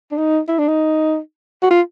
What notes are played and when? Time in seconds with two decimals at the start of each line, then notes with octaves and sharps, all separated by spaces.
0.11 D4
0.18 D#4
0.48 E4
0.58 D4
0.68 D#4
1.62 F#4
1.70 F4